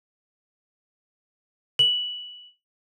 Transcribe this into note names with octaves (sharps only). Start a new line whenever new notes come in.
F#7